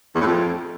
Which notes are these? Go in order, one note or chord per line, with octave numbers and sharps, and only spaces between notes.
E2
A2
F2